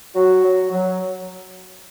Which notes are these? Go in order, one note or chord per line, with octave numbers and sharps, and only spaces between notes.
F#3 F#4
F#3
F#3